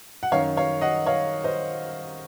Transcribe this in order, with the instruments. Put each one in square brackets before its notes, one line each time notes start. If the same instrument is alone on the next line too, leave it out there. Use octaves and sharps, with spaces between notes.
[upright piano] F#5
F#2 D#3 C#5 F5
C#5 F5
D#5 F#5
C#5 F5
C5 D#5